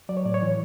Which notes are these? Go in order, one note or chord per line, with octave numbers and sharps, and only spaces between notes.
F#3 D5
C#5
A2 D5
C#5
E3